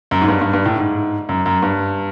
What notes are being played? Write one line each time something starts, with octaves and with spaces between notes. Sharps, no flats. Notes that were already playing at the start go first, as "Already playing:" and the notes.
F#2
G#2
G2
G2
G2
A2
G#2
F#2
F#2
G2